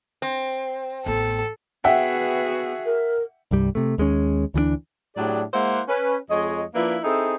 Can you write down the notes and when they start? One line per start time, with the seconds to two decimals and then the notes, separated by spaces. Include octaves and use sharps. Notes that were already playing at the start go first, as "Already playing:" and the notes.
0.22 C4
1.06 A1 B3 A4
1.84 B3 F#4 G#4 E5 F#5 G5
2.85 A#4
3.51 C2 G2 G3
3.75 C3 A3
3.98 D#2 G#3 A#3 C#4
4.54 D2 E3 F#3 D4
5.16 A2 F#3 D4 G4 G#4 D5
5.54 G#3 A#3 E4 C5 F#5
5.88 C#4 B4
6.30 F2 G#3 C#5 D#5
6.74 F3 A#3 D4 E4 B4
7.03 C4 D#4 E4 G#4 A4